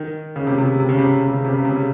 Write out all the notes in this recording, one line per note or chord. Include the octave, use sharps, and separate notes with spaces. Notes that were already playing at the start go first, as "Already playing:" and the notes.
Already playing: D#3
C#3
C3
C3
C3
C#3
C3
C3
C#3
C3
C#3
C3
C#3